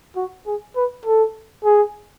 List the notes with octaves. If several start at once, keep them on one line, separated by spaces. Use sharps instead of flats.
F#4
G#4
B4
A4
G#4